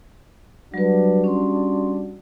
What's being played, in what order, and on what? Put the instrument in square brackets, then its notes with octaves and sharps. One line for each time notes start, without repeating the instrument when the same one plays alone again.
[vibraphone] F#3 B4 [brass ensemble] G3 D4 F#4
[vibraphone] C#4 C6